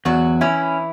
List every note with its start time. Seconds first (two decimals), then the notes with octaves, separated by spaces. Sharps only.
0.05 E2 F#3 F#4
0.41 E3 C#4 E4